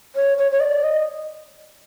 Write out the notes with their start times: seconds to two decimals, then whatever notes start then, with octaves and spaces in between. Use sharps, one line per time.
0.16 C#5
0.38 C#5
0.51 C#5
0.60 D#5
0.64 D5
0.83 D#5